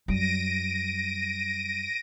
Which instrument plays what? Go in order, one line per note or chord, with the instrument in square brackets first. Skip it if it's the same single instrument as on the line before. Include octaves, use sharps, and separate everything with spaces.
[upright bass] F#2 G3 [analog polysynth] A#6 D7 D#7